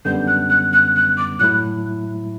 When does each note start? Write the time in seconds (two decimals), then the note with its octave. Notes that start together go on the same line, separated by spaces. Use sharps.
0.05 F#2 D3 G3 B3 G6
0.27 F#6
0.50 F#6
0.73 F#6
0.96 F#6
1.17 D6
1.39 A2 F#3 A3 E4 F#6